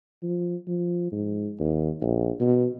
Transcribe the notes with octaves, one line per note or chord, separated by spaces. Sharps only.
F3
F3
G#2
D#2
A#1
B2